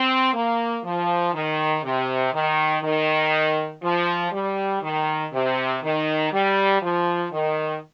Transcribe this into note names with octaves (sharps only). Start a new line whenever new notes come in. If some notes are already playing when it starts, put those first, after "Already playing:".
Already playing: C4
A#3
F3
D#3
C3
D#3
D#3
F3
G3
D#3
C3
D#3
G3
F3
D#3